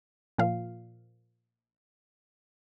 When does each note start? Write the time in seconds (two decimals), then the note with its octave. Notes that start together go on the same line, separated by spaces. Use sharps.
0.38 A#2 F3 F5